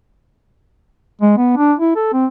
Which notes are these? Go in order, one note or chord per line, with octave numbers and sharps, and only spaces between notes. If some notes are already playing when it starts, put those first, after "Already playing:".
G#3
B3
D4
E4
A4
C4